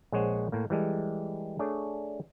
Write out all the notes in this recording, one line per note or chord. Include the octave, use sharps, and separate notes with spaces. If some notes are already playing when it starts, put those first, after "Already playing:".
A#1 G#3 G#4 C5 C#5 F#5
A2 A#3
E3 G3 G#3 A4
A3 D4 G#4 C#5 D5